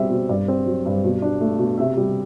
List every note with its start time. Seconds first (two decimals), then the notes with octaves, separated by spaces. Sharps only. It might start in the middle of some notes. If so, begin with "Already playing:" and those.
Already playing: B2 G3 C4 E5
0.10 B2
0.29 G2 D5
0.48 C4
0.66 F#3
0.86 G2
1.04 B2
1.22 D4
1.41 A3
1.59 B2
1.78 C3 E5
1.97 G3